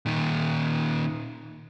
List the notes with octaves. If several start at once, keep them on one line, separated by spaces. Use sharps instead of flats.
A#2 D#3